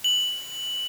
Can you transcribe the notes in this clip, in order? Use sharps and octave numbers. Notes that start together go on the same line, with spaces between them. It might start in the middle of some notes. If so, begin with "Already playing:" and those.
F#7